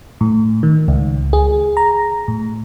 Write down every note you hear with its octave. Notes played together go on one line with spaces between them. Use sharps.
A2
D#3
C#2
G#4
A#5
A2